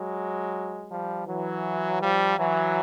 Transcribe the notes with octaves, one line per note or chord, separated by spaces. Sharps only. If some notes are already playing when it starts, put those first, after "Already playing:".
Already playing: F#3 G#3
F3 G3
E3 F#3
F3 G3
E3 F#3